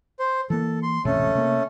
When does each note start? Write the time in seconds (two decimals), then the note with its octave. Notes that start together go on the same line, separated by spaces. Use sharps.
0.19 C5
0.50 E3 A#3 A4
0.83 C6
1.05 E1 A1 C3 A3 C#4 A4
1.35 C3 A#3